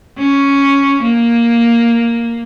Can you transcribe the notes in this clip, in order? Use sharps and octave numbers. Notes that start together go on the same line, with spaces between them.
C#4
A#3